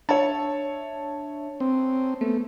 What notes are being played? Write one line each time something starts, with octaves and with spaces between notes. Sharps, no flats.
D4 C#5 E5 A5
C4
A3 B3